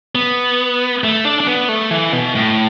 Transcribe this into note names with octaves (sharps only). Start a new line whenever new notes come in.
B3
A3
D4
D4
B3
A3
E3
B2
A2